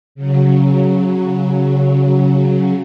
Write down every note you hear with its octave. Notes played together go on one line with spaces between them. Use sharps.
C#3 F#3